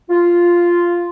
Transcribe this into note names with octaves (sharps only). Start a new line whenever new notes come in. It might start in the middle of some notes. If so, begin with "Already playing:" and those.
F4